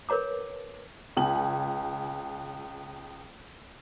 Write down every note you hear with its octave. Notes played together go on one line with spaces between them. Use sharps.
A#4 B4 C#5 A#5 D6
C#2 G#5 F#7